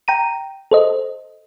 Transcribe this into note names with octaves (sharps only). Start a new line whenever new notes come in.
G5 A#5 D#7
A4 C5 D#5